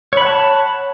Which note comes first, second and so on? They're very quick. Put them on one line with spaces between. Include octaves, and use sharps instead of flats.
C#5 B5 F#5 A5